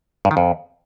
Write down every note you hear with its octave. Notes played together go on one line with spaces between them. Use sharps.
G2
D#3
F2